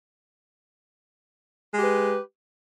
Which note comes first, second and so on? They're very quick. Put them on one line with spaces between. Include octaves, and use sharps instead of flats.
G#3 G4 B4